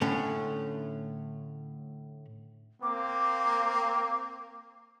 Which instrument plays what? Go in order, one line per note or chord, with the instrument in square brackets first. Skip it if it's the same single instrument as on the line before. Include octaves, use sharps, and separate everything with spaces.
[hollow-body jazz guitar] A2 D3 A3 C#4
[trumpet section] A#3 C4 [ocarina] D6